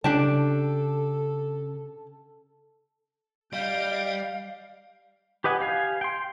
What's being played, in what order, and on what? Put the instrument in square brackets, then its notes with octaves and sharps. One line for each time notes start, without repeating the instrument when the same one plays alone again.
[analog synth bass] C#3 [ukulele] D4 G4 A5 [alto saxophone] A4
[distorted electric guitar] G3 [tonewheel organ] D#5 [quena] F5 [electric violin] G6 D7
[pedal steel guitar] G4 B4 D#5 F#5 G#5
G4 F5 G#5
G5 C6